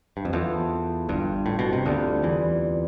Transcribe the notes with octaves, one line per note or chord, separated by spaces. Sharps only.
G2
F2
E2 B3 F4 A4 C5
G1 G2
A2
B2
C3
D2 D3 G3 C4 F4
E2 E3